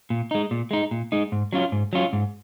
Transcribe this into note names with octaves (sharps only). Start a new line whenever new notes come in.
A#2
G#3 D#4
A#2
G#3 D#4
A#2
G#3 D#4
G#2
F#3 C#4 F4
G#2
F#3 C#4 F4
G#2